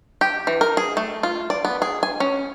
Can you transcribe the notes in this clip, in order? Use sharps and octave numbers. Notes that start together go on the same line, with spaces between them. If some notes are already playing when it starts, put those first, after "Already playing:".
G4
E3
A#4
G#4
A3
F4
D5
B3
G#4
G#5
C#4